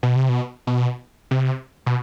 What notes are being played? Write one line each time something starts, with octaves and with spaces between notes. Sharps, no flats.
B2
C3
B2
B2
C3
B2